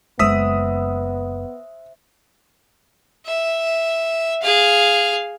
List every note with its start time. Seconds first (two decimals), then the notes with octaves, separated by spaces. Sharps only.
0.19 F#1 G#3 B3 C5 E5 D#6 E6 B6
3.26 E5
4.42 G#4 F5